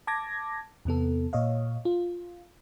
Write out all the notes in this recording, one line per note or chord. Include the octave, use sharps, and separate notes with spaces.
A5 D6 G#6 A#6
E2 C3 B3 A4
A#2 C#5 D#5 F5
F4